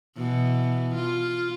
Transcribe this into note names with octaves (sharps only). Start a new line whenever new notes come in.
B2 E3
F4